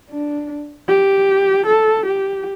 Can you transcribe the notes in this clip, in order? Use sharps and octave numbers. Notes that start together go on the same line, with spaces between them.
D4
G4
A4
G4